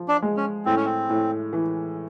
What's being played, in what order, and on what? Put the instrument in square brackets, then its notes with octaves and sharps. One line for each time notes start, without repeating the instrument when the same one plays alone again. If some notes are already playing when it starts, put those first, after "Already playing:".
Already playing: [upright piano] F3
[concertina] D4
[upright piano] G#3
[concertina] C#4
[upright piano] A2 [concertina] C4
[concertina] C#4
C4
[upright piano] A2
E3